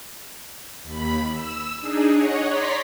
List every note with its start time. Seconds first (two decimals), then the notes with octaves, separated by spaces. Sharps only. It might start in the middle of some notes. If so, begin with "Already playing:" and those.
0.83 D#2 B5
1.32 E6
1.81 D4 D#4 G#4
2.12 C#5 D#5 F#5
2.45 C#5 D5 A#5 C6 B6